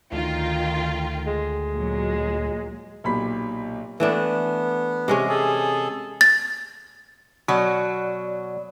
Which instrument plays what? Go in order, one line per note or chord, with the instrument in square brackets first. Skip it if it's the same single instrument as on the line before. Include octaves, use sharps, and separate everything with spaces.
[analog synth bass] D2 [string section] D#3 F4 G5
[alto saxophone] G#3
[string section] A#2 F#3
[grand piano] B1 A#2 G4 B5 B6
[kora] E3 A3 D4 [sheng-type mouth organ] B3
[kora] C3 G#3 C#4
[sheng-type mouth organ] G#4 A4
[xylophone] A6
[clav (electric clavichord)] B2 [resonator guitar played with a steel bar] F#3 [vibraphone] D5